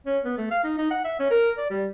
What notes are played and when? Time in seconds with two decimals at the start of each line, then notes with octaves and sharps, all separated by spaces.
0.06 C#4
0.24 B3
0.38 A3
0.51 F5
0.64 D#4
0.78 D#4
0.91 F#5
1.05 E5
1.20 C#4
1.31 A#4
1.58 D5
1.70 G3